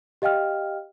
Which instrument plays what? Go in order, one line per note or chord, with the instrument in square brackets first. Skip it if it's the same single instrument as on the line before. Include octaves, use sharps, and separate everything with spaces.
[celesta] G4 D#5 F5 G5 F6